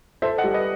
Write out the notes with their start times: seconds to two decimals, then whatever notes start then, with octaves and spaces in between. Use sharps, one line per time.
0.22 A4 C5 E5
0.38 D#5 F#5
0.44 G3
0.54 B4 D#5